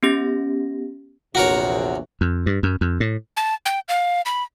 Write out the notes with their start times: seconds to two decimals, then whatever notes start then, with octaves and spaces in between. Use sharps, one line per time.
0.03 B3 C#4 G4 A#6
1.35 A#1 E2 C3 F#4 A#4 C#5
2.21 F2
2.46 G2
2.63 F#2
2.81 F2
3.00 A2
3.37 A5
3.66 G5
3.89 F5
4.26 B5